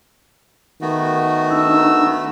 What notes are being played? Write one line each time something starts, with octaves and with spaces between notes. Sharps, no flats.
D#3 A3 B3 F#4
D4 D#4 E6